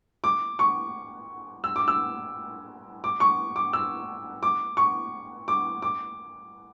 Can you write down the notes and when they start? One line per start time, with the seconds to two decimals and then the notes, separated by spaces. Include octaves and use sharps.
0.24 D6
0.59 C#6
1.64 E6
1.76 D6
1.88 E6
3.04 D6
3.20 C#6
3.56 D6
3.73 E6
4.43 D6
4.77 C#6
5.48 D6
5.82 D6